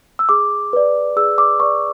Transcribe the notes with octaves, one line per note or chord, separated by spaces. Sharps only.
E6
G#4 D6
B4 D5
G#4 E6
D6
B4 D5 C#6